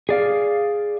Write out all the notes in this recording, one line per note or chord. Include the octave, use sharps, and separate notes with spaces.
G#4 D5 F5